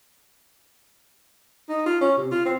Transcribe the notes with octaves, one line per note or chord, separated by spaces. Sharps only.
D#4
F4
C#4
C3
F4
C4